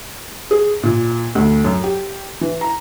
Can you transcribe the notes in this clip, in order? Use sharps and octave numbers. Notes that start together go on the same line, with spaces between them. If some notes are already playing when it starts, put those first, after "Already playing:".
G#4
A#2
D2
F#2
G4
E3
A#5